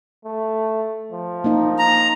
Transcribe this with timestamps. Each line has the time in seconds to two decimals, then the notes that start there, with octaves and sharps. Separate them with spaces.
0.25 A3
1.12 F3
1.44 A#3 D#4
1.79 A#5